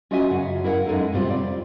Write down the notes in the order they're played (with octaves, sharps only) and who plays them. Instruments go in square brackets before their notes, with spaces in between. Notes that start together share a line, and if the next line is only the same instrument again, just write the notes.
[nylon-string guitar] C#4 F4 F#4 D#5 E5 G#5
F#2 C#3 F#5
E4 A#4 D5 F5 F#5
F#2 G#3 D#4 A4
A2 C3 G3 C4 F4
F2 D5